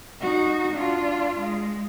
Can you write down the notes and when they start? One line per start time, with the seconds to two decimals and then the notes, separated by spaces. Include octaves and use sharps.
0.21 D#4 F#4
0.73 D4 F4
1.38 G#3